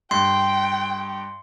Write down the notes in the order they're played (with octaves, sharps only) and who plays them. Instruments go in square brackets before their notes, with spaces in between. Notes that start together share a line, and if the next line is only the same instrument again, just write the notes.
[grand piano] G2 [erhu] G5 [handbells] C6